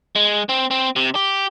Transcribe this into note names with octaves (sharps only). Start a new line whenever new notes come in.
G#3
C4
C4
C3
G4